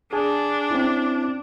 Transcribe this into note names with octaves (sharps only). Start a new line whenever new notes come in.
D4 G#4 G#5 A5
C4 C#4 E4